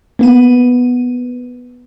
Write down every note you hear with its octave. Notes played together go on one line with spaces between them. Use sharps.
A#3 B3 D#7